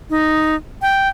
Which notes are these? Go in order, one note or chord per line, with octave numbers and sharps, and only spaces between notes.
D#4
G5